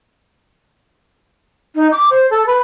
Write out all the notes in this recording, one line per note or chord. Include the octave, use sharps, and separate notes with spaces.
D#4
D6
C5
A4
B4